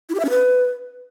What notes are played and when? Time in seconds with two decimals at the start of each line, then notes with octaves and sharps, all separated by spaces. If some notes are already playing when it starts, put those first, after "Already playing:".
0.09 E4
0.15 G4
0.20 E5
0.25 C#4
0.30 B4